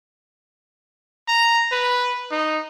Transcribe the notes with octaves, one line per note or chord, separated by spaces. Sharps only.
A#5
B4
D#4